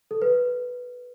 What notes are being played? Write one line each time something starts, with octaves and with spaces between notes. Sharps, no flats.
A4
B4